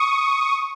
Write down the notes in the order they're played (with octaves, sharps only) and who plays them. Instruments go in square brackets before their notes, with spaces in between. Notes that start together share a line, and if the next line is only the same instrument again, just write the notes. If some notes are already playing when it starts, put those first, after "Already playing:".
Already playing: [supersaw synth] C#6 D#6